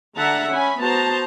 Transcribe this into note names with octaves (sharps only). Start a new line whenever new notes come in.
D3 E5 F#5 A5 A#5
C#4 G#5 B5
B3 F#4 C5 A5 A#5